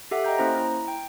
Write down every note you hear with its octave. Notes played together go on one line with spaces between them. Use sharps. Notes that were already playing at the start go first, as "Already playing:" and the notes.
G4 A4 E5 F#5
D#5 G5 A#5 G6
A#3 C#4 E4 C5 A#5
E4 A#5
G5